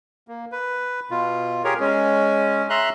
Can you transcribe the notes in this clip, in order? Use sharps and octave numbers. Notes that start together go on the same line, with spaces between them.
A#3
B4
B2 F4
G4 G#4 A#4 C#5
G#3 C#4
E5 A#5 C6 F#6